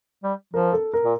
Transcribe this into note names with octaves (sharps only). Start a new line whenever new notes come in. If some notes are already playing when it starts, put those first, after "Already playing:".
G3
F3 A#4
A4
A#4
A#2